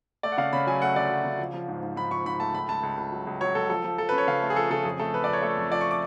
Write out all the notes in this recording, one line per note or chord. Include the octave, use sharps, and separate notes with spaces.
A3 D5
F#5
C#3 F5
C#3 B5
F#3 G#5
A3 F#5
D2 D5
F#3
C#3
F3
F3
G#2
G#2
G#2 B5
F3 C#6
G#2 B5
A3 A5
C#2 B5
C#2 A5
C#2
C#2
F#3
C#2
F#3 C#5
C#2 A4
F3 A4
F3
F3 A4
C#4 B4
C#5
C#3 F5
A3
G#4
F3 A4
C#3 A4
F2 G#4
A3 A4
F2 B4
F2 D5
C#5
A3 A4
F2
F3 D5
C#6
D6